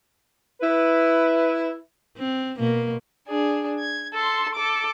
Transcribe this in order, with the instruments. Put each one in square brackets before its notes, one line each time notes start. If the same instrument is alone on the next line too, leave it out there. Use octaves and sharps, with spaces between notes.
[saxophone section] E4 B4
[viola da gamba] C4
B2 A#3
[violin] D4 G#4
G#6
A4 C6
A4 D6